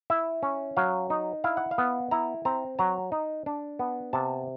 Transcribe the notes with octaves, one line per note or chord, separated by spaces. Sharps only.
E4 E5
C#4
F#3 F5
D#4
E4 F5
F#5
F5
B3
E4 A#5
C4 A#5
F#3 A#5
D#4
D4
B3
C3 A5